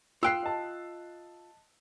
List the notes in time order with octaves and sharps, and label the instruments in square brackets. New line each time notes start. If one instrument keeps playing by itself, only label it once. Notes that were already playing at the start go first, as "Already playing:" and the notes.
[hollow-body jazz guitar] F4 G5 [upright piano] E6 F#6 C7
[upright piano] D#5 A5